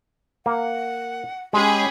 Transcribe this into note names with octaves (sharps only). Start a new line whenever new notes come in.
A#3 F#5
G#3 C#4 G4 G#4 B5